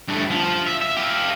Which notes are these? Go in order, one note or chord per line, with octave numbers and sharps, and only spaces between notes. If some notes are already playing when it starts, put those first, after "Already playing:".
G2 A3
F3
E5
E5
G4 F5